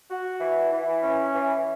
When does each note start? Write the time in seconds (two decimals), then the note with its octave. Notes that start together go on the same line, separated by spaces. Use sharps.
0.10 F#4
0.40 E3
0.72 E3
1.03 C#4
1.34 E3